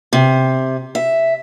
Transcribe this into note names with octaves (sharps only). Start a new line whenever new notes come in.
C3
E5